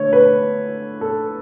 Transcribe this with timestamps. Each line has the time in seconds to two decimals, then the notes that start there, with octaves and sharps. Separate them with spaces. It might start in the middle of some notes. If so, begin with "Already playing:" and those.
Already playing: D3 A3 C#5
0.13 B4
1.01 A4